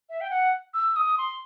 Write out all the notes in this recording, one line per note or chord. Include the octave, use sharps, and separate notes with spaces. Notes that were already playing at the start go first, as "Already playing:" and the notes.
E5
G5
F#5
E6
D#6
C6